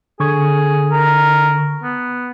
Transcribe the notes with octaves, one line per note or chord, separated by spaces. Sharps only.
D3 G#4 C#6 G#6
A#4
B3